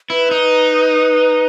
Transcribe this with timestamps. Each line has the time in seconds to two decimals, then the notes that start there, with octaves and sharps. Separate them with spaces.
0.10 E4 B4
0.31 D#4